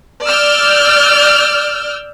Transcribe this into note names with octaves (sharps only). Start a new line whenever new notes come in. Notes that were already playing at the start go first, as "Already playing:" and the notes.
D5 E6 F6 G6